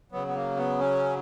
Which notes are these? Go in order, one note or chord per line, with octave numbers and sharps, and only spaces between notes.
C#3 F#3 B3
B3
A#3
B3
C#4